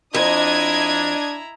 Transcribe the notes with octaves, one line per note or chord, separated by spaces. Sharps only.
F2 D4 E4 D#5 A#5 D#6 G#6